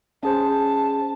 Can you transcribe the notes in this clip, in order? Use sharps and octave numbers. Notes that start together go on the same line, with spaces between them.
C#4 G#4 C5 A5